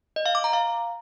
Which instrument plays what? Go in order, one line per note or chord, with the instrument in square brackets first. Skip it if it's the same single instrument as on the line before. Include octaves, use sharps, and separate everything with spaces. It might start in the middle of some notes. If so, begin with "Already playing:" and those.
[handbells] D#5
F5
D6
A#5
F5